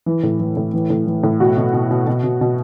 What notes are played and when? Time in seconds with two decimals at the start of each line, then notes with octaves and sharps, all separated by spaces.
0.06 E3
0.23 A2
0.40 E3
0.57 A2
0.74 E3
0.90 A2
1.07 E3
1.23 A2
1.40 B2 F#4
1.57 B2
1.74 B2
1.91 B2
2.07 B2
2.24 B2
2.41 B2